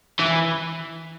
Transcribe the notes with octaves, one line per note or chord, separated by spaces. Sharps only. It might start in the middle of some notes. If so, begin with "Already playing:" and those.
E3